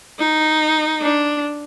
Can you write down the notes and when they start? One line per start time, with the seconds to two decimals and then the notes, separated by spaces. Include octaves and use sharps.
0.20 D#4
1.02 D4